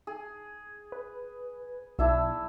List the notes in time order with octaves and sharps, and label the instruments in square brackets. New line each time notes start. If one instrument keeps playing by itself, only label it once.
[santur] G#4
[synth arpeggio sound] B4
[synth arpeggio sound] B1 [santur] D4 E4 E5